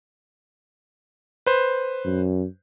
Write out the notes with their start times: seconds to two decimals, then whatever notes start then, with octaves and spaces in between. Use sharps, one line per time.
1.46 B4 C5
2.05 F#2